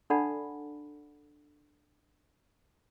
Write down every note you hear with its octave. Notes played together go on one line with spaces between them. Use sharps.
D4 A4 D5 F#5 A5 B5